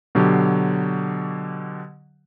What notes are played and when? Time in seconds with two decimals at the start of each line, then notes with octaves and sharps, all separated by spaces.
0.15 B2 D3 F#3 G4